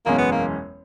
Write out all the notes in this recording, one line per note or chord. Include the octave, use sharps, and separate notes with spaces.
F#1 E2 B2 G#3 A#3 C#4
B3
A#3